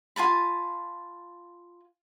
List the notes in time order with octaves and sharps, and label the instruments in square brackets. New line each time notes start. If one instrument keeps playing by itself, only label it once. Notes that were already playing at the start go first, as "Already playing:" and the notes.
[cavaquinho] F4 G#5 A5 B5